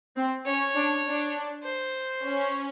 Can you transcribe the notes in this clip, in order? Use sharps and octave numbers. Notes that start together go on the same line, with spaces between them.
C4
C#4 C#5
D4
D4
C5
C#4